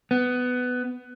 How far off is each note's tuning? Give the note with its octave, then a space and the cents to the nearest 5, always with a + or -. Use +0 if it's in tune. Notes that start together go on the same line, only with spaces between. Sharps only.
B3 +15